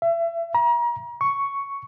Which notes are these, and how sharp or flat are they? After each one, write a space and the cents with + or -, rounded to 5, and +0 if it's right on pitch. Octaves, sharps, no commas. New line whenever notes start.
E5 +35
A#5 +35
C#6 +5